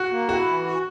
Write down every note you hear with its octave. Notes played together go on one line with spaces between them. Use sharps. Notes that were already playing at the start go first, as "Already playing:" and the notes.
Already playing: F#4
A#3
E4 F#4
E3
F#4